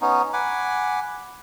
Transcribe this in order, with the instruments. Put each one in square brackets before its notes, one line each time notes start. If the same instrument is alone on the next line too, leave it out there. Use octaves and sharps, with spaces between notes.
[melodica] B3 C#4 D#4
F#5 G#5 B5 D6